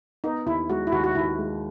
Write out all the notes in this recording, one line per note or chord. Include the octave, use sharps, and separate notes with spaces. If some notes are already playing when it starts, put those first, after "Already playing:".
B3 D#4
D#2 E4
G#3 F#4
E4
D#2 F#4
F#4
D#2 E4
G#3